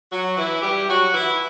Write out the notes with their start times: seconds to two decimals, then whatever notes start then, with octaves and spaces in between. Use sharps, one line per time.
0.11 F#3 F#4
0.37 E3 E4
0.62 G3 G4
0.88 F#3 F#4
1.14 E3 E4